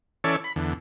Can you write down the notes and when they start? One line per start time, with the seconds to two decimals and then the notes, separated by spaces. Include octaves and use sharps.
0.24 E3 C#4 A4 C#5 D5
0.44 B5
0.56 E2 D3